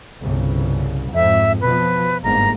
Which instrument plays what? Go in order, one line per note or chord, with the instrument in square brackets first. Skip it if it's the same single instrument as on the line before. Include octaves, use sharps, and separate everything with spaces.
[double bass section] G1 C2 C#3
[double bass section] F2 G#2 [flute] E5
[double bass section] B2 F3 [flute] B4
[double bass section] G1 G#2 A#3 [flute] A#5